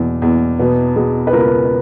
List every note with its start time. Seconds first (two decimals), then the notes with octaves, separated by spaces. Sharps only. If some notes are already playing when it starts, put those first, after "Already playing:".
Already playing: E2 B2
0.22 E2
0.59 B2 B3
0.96 B2 G#4
1.27 B4
1.33 C#2 A#4